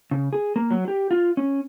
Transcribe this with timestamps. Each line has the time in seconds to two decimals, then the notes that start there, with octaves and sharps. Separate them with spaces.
0.11 C#3
0.33 G#4
0.56 A#3
0.71 F#3
0.88 G4
1.11 F4
1.37 C#4